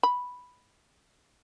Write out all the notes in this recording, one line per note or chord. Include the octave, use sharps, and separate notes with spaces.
B5